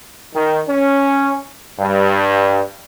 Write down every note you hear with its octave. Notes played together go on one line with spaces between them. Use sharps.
D#3
C#4
G2